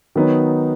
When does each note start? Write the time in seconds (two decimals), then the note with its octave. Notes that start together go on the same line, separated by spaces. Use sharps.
0.15 D#3 F#3 B3 D#4